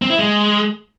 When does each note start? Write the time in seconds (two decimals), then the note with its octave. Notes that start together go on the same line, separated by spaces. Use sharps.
0.02 C4
0.10 E4
0.18 G#3